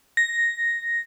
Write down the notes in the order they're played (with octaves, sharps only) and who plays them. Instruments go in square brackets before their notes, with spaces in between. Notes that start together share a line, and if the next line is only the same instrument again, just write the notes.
[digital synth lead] A#6